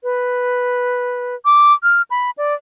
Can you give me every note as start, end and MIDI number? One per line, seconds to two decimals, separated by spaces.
0.03 1.35 71
1.45 1.73 86
1.83 2.02 89
2.11 2.31 83
2.38 2.54 74